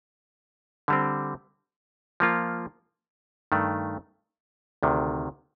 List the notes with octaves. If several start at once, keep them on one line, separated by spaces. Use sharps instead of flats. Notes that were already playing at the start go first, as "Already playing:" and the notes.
D3 G3 C4
F3 A#3 F4
G2 D#3 A3
D2 C3 D#3